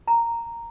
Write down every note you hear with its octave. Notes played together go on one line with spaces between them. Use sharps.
A#5